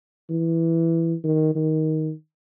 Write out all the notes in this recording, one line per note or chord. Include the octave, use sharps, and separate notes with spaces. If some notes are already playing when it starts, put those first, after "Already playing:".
E3
D#3
D#3